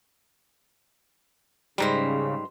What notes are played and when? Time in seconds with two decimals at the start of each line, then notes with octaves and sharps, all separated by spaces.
1.78 G#2 C#3 G3 C5 A#5 B5